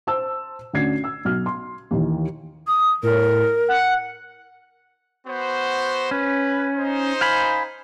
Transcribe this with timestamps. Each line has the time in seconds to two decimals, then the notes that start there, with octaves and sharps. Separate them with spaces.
0.07 C5 A5 E6
0.73 D2 C#4 D4 G#6 C7
1.04 E6
1.25 B1 F6
1.46 C6
1.91 D#2 D#3 E3
2.67 D#6
3.03 A2 A#4
3.68 F#5
5.27 B3 F#4 C5
6.11 C#4 B4
6.76 D#4 C5
7.21 F5 G#5 B5